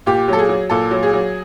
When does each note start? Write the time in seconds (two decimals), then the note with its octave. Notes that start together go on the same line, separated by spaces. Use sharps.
0.06 A#2 G4
0.28 F#3 A4
0.38 G#4
0.49 F#3
0.70 A#2 A4
0.91 F#3
1.03 G#4
1.13 F#3